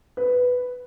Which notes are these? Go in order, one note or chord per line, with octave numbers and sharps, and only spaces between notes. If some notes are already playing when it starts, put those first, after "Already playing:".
B4